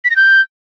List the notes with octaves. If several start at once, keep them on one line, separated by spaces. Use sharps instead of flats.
B6
A#6
G6